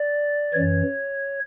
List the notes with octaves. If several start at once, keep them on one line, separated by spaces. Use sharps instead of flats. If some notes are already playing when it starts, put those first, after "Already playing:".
Already playing: D5
F#2 E3 C#5